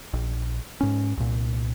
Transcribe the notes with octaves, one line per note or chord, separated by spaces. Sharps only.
A#1
G#2 C#4
C2 A#2